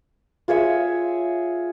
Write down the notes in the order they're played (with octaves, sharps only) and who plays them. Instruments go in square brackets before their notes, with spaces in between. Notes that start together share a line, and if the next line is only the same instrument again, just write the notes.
[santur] F4 G#4 C#5 E5